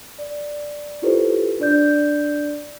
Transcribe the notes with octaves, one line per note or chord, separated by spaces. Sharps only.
D5
E4 F4 G4 A4 B4 C5
D4 D5 G6